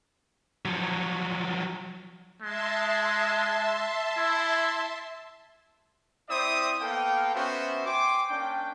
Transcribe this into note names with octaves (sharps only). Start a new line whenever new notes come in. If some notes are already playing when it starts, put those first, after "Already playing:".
F3 F#3
G#3 E5 A5 C6
E4
C4 E4 C5 D5 E5 D#6
A#3 B3 A4 F5 G5
B3 C#4 F#4 C5 E5
G5 G#5 C6 D6
A#3 C#4 D4 G5